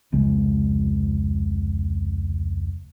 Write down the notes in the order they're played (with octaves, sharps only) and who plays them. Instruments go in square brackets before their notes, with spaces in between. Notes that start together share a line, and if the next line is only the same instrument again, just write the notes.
[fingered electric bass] F1 C#2 C#3 G#3